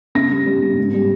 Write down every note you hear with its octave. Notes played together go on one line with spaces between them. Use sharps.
C#3 A#6
G3
G3
C#3
G#2
G3